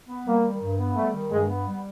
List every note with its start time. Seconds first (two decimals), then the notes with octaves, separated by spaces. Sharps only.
0.08 B3
0.26 G3 A#3
0.44 D#3
0.61 G2
0.78 B3
0.96 G3 A3
1.13 D#3
1.30 G2 G#3
1.48 B3
1.66 G3